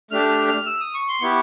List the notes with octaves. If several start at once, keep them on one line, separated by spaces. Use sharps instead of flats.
A3 D4 G4 F6
F6
F6
E6
D#6
C#6
C6
B3 E4 G4 C#6